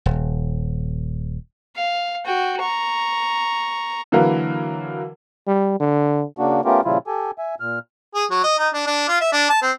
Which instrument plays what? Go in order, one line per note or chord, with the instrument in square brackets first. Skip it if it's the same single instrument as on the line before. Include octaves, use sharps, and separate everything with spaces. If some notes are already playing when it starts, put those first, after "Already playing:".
[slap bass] D#1
[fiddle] F5
F#4 G5
A#5 C#6
[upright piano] D3 E3 F#3 A#3 A#4 B4
[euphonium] G3
D3
[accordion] C#3 A#3 D4 F#4
A3 B3 C#4 F4 G4 A#4
A#2 C#3 F3 G3 E4 F4
G4 A4 G#5
E5 G#5
A#2 F6
[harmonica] G#4
F#3
D#5
D#4
D4
D4
F4
E5
D4
A5
C4